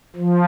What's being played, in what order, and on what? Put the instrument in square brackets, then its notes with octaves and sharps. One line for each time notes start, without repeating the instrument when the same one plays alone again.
[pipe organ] F3